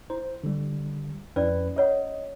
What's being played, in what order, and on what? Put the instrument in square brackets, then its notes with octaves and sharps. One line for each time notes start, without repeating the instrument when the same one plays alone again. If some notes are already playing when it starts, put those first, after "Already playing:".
[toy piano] E4 [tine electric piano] C5
[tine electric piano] D3 G3
[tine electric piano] F2 E4 B4 [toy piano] C#4 D5
[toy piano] G4 C#5 F#5 [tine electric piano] D#5